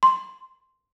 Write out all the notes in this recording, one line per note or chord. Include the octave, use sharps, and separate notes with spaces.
C6